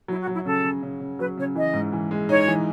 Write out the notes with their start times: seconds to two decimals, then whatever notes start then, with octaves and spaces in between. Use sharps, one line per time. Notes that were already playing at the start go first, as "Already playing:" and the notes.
0.08 F#3 E4
0.21 F#4
0.27 F#3
0.33 E4
0.45 C#3 A4
0.64 C#3
0.83 C#3
1.00 C#3
1.19 F#3 B4
1.37 C#3 C#5
1.55 E3 D#5
1.74 G#2
1.93 E3
2.11 G#3
2.29 D#4 C#5
2.48 E3